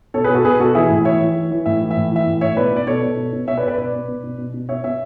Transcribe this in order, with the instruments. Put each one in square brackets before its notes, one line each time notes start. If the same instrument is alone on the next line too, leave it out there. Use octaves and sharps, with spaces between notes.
[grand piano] B2 A4 C#5
G#4 B4
B2 F#4 A4
B2 G#4 B4
B2 F#4 A4
E3 E4 G#4
A2
E3 C#5 E5
E3
E3
E3
A2 E5
E3
E5
A2
E3 E5
A2
A2 C#5 E5
B2 B4 D5
B2 D5
B2 A4 C#5
B2
B2
B2
B2 C#5 E5
B4 D5
B2
B4 D5
B2 B4 D5
B2
B2
B2
B2
B2
B2 C#5 E5
B2 C#5 E5